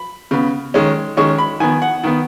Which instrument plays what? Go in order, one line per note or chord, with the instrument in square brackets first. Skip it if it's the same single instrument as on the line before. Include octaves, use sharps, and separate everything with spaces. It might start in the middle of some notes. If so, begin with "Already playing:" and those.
Already playing: [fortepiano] B5
C#3 B3
D#3 G#3 C#4
D#3 G#3 C#4 C#6
B5
D#3 B3 G#5
F#5
D#3 B3